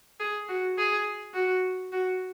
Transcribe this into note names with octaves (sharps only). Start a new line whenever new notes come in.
G#4
F#4
G#4
F#4
F#4